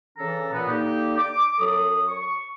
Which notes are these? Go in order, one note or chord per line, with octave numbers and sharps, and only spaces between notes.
C#3 E3 C#4 D4 A4 A#5
A#2 B3
D3 A#3 D#4 G4
D6
F#2 F#3 A4 D#6
C#6